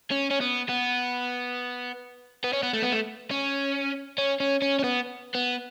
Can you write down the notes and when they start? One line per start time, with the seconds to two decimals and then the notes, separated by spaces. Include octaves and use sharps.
0.11 C#4
0.30 C#4
0.41 B3
0.69 B3
2.44 B3
2.53 C#4
2.63 B3
2.73 A3
2.82 B3
2.92 A3
3.31 C#4
4.18 C#4
4.40 C#4
4.62 C#4
4.79 C#4
4.84 B3
5.34 B3